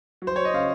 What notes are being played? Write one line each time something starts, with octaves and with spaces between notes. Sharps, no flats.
F#3
C5
C#5
D#5
C#3 F5